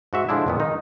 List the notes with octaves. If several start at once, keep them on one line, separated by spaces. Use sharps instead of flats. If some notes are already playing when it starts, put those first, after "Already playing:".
G#2 F#4 E5
D3 F3 G#3 D4 E4
F2 A#2 B3
D#3 D#4